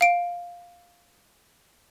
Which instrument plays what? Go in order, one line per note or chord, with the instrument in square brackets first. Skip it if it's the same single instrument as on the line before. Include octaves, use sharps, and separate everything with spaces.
[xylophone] F5 D7